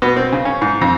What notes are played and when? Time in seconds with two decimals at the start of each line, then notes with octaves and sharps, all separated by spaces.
0.02 B2
0.16 C4
0.32 C#3
0.45 C#4
0.62 G#2
0.81 F2